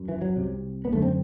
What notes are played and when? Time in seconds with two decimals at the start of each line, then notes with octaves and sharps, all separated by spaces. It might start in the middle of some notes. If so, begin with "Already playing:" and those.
Already playing: F#2
0.09 E3
0.22 F#3
0.36 C2 C3
0.85 B3
0.92 F#2 D3 A3
1.02 C4